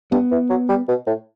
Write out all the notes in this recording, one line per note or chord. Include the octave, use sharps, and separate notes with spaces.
G2 B3
E3
F#3
G3
B2
A2